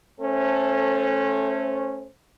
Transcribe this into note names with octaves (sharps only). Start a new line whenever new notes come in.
A3 C#4 A4 C5